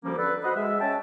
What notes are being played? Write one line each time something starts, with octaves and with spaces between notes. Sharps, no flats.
D2 F3 G3 A#3 C#4
D3 A4 B4
F#4 C5 D#5 F#5 B5
G#3 E5
C#4 G5 A5